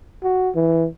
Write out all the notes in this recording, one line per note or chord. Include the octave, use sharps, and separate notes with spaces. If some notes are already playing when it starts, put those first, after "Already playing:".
F#4
E3